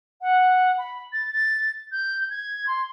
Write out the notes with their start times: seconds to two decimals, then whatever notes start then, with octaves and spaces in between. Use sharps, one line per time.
0.21 F#5
0.78 B5
1.13 A6
1.33 A6
1.92 G6
2.30 G#6
2.67 C6